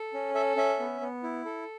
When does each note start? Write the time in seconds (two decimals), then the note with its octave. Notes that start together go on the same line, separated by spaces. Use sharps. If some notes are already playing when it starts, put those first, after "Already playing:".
Already playing: A4
0.14 C#4
0.35 A4 E5
0.57 C#4 E5
0.80 B3
1.01 B3
1.23 E4
1.45 A4